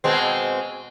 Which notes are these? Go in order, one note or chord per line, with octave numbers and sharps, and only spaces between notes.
B2 G#3 C4